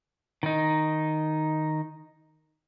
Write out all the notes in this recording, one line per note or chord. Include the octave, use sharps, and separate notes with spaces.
D#3 D#4